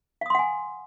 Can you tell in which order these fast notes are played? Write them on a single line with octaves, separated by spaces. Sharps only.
F5 D#6 C6 F#5 G#5